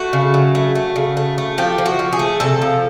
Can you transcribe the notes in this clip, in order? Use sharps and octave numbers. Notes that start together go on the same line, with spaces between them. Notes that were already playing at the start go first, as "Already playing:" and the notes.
Already playing: A3 F#4
C#3
F#3
A3
A3
C#3
A3
A3
F3 G4
F3
F#4
F3
G#4
A3
C3 A4
F3